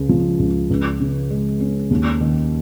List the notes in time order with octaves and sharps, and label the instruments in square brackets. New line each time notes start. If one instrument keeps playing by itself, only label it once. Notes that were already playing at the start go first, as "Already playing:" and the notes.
Already playing: [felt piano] C#2 C#3
F3
C#2
C#2
C#3
G#3
C#4
D#2
D#3